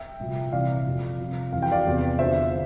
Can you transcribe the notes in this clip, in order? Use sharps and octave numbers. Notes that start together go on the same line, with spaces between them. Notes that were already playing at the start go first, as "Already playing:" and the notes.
Already playing: E5 G5
C2 A#2 F3
C2 C3 E3 D5 F5
F2 C3 F3
C2 C3 F3
F2 E3 F5
G5
D5 F5
E2 C3 F3
E2 D3 F3 C5 E5